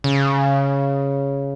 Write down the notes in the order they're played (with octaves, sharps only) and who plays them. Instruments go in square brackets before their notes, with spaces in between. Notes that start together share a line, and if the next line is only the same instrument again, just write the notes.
[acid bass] C#3